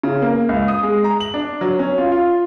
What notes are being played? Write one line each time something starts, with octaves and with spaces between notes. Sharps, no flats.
C#3
A#3
C#2
D#6
G#3
A#5
F#7
D4
F#3
C#4
F4
F4